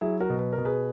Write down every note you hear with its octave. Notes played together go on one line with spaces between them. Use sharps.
F#3 E4 G#4
F#4 A#4
B2
B4
A#4
B2
G#4 B4